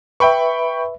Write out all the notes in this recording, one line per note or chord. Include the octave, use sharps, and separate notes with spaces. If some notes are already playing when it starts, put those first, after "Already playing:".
B4 E5 G5 B5 C#6